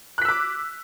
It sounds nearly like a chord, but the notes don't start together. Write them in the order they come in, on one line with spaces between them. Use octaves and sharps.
F#6 B6 E6 D6